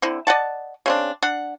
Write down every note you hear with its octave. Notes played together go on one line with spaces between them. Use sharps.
D3 C4 E4
D5 D#5 F#5 A5
C#3 C4 D4
D4 F#5